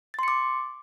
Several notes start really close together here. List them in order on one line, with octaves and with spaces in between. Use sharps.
A6 C6 C#7 D6